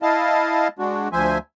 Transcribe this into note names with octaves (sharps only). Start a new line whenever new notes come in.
E4 D#5 F5 A5
G#3 D4 F#4
D2 F3 C5 E5 G#5